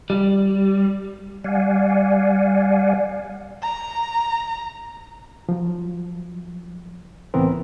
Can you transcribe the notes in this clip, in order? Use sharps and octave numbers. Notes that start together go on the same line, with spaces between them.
G3
G3 D5 F5 F#5 G#5
A#5
F3 F#3
C#2 A2 E3 B3 C4 A#4